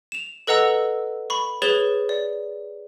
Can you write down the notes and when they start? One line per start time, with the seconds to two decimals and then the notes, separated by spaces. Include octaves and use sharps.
0.12 E7 F7
0.47 A4 B4 D#5 F#5 A#5 E6
1.30 B5 C#6
1.62 G#4 B4 C#5 A6 E7 G7
2.09 D5